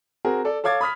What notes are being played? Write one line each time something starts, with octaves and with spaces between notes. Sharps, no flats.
C4 F#4 G#4 A#4
A4 D5
A4 C#5 F5 D6 G#6 A6
B5 D#6 F6 B6